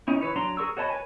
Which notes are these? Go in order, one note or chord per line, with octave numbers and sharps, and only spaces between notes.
C#4 D#4 E4
E3 B4 C#5
F#3 D4 A#5 C6
G#4 A#4 C#6 E6
F#4 C#5 D#5 A5 B5
B4 C#5 G#5